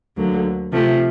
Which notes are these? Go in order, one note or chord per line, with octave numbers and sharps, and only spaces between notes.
D2 D3 F#3 A#3
C3 F3 A3